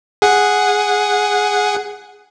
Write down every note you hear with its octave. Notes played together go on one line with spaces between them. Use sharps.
G#4 F#5